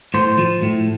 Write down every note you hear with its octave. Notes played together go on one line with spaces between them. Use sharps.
A2 C5
F3
A2